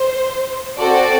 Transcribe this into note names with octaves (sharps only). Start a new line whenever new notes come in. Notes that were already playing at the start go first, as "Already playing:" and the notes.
Already playing: C5
C4 F#4 A4 D5